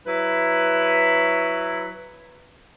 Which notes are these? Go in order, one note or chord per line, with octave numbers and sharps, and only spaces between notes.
F#3 E4 B4